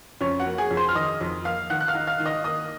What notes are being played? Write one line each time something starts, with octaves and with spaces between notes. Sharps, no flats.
F2 C#4 C#5
F#4 F#5
A#3
G#4 G#5
F2
C5 C6
F6
D#3 D#5 D#6
F2
A#3 F5 F6
D#3 F#5 F#6
F#6
F5 F6
D#4
F5 F6
D#3
D#5 D#6
A#3 D#5 D#6